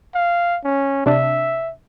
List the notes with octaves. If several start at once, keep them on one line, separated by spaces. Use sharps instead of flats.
F5
C#4
C3 D4 E5